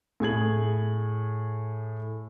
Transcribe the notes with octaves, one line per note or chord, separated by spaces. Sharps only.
A2 G#4 G#6 F#7